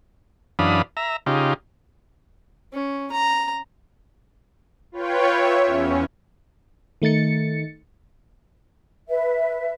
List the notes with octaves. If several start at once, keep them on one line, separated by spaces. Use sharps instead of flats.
F#2 E3 D4 F5 B5 D#6
E5 A#5
C#3 D#4 F4 G4
C#4
A#5
F4 B4 C#5 G5
C#5 E5
E2 C#4
D#3 A3 D#4 A6 C#7
B4 E5